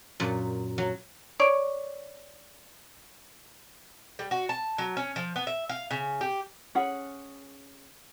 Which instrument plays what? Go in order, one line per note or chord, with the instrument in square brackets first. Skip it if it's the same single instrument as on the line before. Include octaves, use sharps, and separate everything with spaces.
[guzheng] F#2 A#2
F#3
[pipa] C#5 D5
[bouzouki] G3
F#4
A5
F#3
C#4
F3
B3
E5
F5
C#3
G4
[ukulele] C#4 G#4 F#5